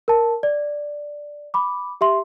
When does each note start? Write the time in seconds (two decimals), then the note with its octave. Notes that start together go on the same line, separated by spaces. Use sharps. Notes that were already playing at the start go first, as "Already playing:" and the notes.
0.08 A#4 A5
0.43 D5
1.54 B5 D6
2.01 G4 E5 C6